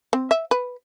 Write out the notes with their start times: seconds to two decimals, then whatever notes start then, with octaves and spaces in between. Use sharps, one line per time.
0.13 C4
0.31 E5
0.51 B4